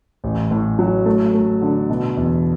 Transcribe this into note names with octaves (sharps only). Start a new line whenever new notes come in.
A1
A2
F#3
A3
A3
D3
B2
E2